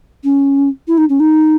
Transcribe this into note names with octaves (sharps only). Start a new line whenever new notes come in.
C#4
E4
D#4
C#4
D#4